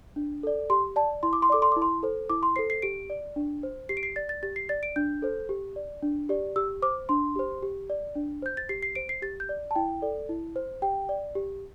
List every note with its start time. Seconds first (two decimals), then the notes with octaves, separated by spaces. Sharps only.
0.16 D4
0.43 A4 D5
0.70 G4 C6
0.96 D5 A5
1.23 E4 C6
1.33 D6
1.42 C6
1.50 A4 D5 D6
1.62 C6
1.72 E4 D6
1.82 C6
2.03 A4 C5
2.29 E4 D6
2.43 C6
2.56 A4 C5 C7
2.70 C7
2.82 G4 D7
3.10 D5
3.36 D4
3.63 C5
3.89 G4 C7
3.97 D7
4.03 C7
4.16 D5 A6
4.29 A6
4.43 G4 A6
4.56 C7
4.69 D5 A6
4.83 D7
4.96 D4 G6
5.22 A4 C5
5.49 G4
5.76 D5
6.02 D4
6.29 G4 D5
6.56 G4 E6
6.82 C5 D6
7.09 D4 C6
7.36 G4 C5
7.62 G4
7.90 D5
8.15 D4
8.42 C5 G6
8.57 A6
8.69 G4 C7
8.83 C7
8.95 C5 D7
9.09 C7
9.22 G4 A6
9.40 G6
9.49 D5
9.71 A5
9.75 E4 G5
10.02 A4 D5
10.29 E4
10.56 C5
10.82 G4 G5
11.09 D5
11.35 G4